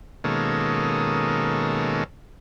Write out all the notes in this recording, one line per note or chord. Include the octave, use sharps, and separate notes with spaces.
B2 D#3 G#3 A#3 C#4 A4